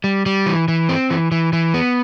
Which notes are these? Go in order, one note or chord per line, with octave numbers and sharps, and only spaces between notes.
G3
G3
E3
E3
C4
E3
E3
E3
B3